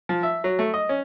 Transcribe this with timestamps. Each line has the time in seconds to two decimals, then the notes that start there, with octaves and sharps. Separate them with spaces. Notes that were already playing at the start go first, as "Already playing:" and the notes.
0.09 F3
0.23 E5
0.44 F#3
0.59 A3
0.74 D#5
0.89 C#4